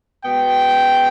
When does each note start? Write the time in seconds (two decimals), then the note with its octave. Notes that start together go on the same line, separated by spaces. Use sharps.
0.25 B2 G#3 B3 G5